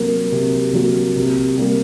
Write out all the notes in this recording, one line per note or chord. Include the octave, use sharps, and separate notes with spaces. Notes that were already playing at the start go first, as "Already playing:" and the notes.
Already playing: C3 F#3 A#3 F#4 A#4
C3
F#3 A#3 F#4 A#4
C3
G3 A#3